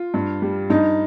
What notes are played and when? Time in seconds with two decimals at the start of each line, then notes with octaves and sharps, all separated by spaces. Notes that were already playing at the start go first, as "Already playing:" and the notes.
Already playing: F4
0.14 G2
0.42 G3
0.70 G2 D#4